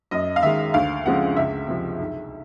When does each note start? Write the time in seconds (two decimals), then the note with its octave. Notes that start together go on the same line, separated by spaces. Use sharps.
0.11 F#2 D#5
0.36 F5
0.43 D#3 G#3 E5
0.74 D2 F5
1.06 C#3 F3 G#3 C4 F#5
1.36 C#2 E5
1.68 C3 F3
1.99 B1